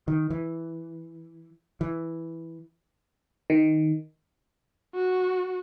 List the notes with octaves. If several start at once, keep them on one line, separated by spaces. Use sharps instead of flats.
D#3
E3
E3
D#3
F#4